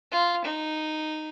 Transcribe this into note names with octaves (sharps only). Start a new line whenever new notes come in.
F4
D#4